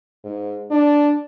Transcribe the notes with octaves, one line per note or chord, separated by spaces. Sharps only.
G#2
D4